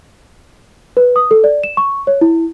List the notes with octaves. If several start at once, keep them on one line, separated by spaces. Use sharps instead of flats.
B4
D#6
A4
D5
E7
C#6
C#5
E4